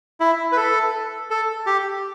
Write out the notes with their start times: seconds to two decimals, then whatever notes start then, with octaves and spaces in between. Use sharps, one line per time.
0.20 E4
0.52 B4
0.57 A4
1.30 A4
1.66 G4